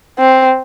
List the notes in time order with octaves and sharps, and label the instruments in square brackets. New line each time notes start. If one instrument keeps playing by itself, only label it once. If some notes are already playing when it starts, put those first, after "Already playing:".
[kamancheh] C4